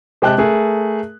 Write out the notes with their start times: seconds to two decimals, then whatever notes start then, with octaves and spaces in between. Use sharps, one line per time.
0.22 C3 G#3 G5 A5 F#6
0.38 A3 G#4 A#4